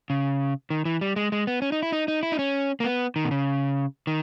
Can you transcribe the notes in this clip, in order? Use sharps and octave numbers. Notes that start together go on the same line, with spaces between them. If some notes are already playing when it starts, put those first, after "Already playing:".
C#3
D#3
E3
G3
G#3
G#3
B3
C#4
D#4
E4
D#4
D#4
E4
D#4
C#4
A#3
B3
D#3
B2
C#3
D#3